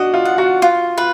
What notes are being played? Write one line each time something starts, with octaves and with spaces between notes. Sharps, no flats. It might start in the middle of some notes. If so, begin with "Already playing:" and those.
Already playing: D4 F#4 D#5
F4
F#5
F#4
F4
F4 B4